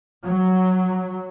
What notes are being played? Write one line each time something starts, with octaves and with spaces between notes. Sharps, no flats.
F#3